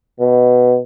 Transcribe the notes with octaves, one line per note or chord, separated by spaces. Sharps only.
B2